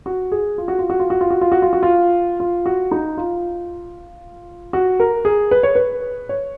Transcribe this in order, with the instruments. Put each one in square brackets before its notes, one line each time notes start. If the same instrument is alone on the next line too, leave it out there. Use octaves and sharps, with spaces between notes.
[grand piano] F#4
G#4
F4
F#4
F4
F#4
F4
F#4
F4
F#4
F4
F#4
F4
F#4
F4
F4
F#4
D#4
F4
F#4
A#4
G#4
B4
C#5
B4
C#5